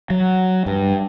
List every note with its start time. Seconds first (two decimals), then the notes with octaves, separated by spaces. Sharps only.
0.10 F#3
0.66 G2